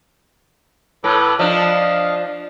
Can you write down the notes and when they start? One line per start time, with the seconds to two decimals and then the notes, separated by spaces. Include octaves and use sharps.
1.04 A2 A4 B4 D6
1.39 F3 D4 D#5 F5